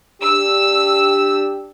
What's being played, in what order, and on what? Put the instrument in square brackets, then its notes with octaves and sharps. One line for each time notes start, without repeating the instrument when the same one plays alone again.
[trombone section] D4 G4 [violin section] E6